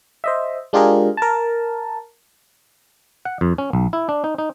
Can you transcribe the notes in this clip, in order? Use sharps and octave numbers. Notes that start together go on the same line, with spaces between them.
C5 D#5 E5
G#3 D4 F4 G4 G#4 A#4
A#4 A5
F#5
F2
C#4
B1
E4
D4
D#4
D#4